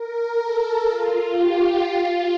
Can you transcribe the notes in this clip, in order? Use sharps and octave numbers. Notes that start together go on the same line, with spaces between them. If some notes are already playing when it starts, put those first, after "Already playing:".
Already playing: A#4
A4
F4
G4
F4